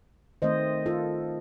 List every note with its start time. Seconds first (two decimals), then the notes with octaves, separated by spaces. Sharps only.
0.42 D#3 A3 C4 C5 D#5
0.86 F4 A4